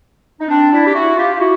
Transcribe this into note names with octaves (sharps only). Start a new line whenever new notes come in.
D#4
C4 D4
D4 E4
G4
E4 F#4
F4 G4
F4
E4 F#4